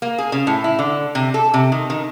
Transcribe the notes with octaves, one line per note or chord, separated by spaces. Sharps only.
A#3
G#4
C#3
A2
E4
D3
C3
A4
C3
D#3
D#3